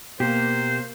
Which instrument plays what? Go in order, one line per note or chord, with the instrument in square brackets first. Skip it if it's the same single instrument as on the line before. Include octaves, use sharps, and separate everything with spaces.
[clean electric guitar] B2 G4 [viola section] A#3 [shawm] C5